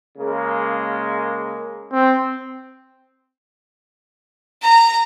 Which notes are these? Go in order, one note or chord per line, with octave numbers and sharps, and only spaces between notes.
C#3 G#3 A#3
C4
A#5